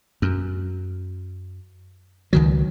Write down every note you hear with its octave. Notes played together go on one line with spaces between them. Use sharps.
F#2
C#2 D#3 F#3